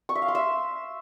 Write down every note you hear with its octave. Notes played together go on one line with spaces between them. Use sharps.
C#6
E5
F5
C6
E5